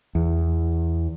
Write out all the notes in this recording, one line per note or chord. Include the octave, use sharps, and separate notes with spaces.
E2